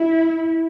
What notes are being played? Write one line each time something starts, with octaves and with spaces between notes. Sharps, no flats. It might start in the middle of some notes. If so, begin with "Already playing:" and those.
Already playing: E4